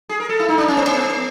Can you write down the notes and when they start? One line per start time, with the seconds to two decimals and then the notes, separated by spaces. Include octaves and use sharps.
0.09 G#4
0.20 A#4
0.29 A4
0.39 E4
0.49 D#4
0.58 D4
0.68 C#4
0.77 B3
0.87 B3